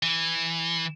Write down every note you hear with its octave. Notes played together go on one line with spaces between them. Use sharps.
E3